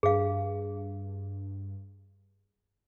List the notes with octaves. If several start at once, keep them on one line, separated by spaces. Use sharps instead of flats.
G2 G#4 F5